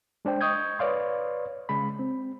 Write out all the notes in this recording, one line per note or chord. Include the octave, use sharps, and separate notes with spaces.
G#3 D4 C5 G5
D#5 C#6 D#6 G6 G#6
B4 C#5 D5 F5 C6
C#3 G#3 B5
C4